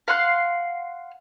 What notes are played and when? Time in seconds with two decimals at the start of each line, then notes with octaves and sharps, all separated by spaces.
0.08 F5 F#5 C6 F#6